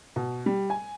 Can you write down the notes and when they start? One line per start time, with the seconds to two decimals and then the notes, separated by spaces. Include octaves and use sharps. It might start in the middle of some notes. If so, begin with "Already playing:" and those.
0.16 B2
0.46 G3
0.70 G#5